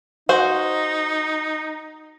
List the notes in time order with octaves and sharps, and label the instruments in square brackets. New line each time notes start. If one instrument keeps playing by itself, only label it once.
[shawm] D#4 [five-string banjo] F#4 C5